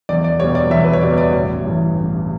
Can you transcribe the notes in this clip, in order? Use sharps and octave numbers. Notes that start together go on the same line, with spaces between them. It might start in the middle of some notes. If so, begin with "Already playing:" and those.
E2 D5
D5
B2 G3 B3 C#5
D5
E2 E5
B4
C#5
B2 G3 B3 D5
D5
A1 C#5
G2 E3
A1